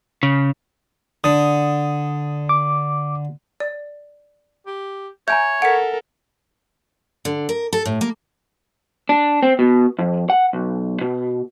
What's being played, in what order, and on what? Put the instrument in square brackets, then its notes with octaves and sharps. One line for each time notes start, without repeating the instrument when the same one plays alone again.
[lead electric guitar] C#3
[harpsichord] D3 [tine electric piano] D#6
[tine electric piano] D6
[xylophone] D5
[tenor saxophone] G4
[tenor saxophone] C#5 [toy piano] E5 G#5 A#5 [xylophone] G6
[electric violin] A4 A#4 [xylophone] F#5 B6
[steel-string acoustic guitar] D3
A#4
A4
A2
A#3
[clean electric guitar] D4
C4
B2
F2
F#5
B1
B2